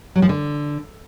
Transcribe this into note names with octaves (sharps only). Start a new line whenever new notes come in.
F#3
F3
D3